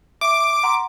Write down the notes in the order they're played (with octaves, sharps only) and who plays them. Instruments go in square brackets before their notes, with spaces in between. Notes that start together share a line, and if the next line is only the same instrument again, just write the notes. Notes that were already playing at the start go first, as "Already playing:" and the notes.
[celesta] E5 [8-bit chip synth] D6
[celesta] F#5 A#5 C6